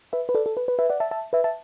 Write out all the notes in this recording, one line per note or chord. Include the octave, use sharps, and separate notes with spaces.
B4 E5
B4
A4 D5
A4
B4
B4
B4 E5
D5 F#5
E5 A5
E5 A5
B4 E5
E5 A5